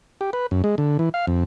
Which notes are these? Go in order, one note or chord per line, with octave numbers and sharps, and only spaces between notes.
G4
B4
F#2
G#3
D3
E3
F5
F2